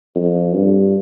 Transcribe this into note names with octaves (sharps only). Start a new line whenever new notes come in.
F2
G2